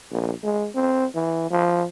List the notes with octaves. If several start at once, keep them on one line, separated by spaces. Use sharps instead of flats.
A#1
G#3
C4
E3
F3